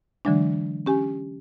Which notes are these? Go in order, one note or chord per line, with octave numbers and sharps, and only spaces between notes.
D3 E3 F#3 G#3 D4
C#4 G4 G#5